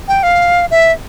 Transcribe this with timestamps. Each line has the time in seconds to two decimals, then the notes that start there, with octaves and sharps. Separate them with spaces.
0.08 G5
0.23 F5
0.71 E5